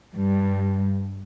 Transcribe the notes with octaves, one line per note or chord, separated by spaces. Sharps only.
G2